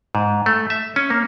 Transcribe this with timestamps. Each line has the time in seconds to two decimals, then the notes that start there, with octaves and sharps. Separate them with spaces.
0.15 G#2
0.46 A3
0.70 E5
0.96 C#4
1.10 A#3